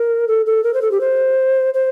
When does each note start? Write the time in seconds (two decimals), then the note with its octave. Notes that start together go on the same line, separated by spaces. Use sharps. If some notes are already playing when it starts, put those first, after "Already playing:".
Already playing: A#4
0.28 A4
0.46 A4
0.64 A#4
0.74 C5
0.82 A4
0.91 G4
1.01 C5
1.74 C5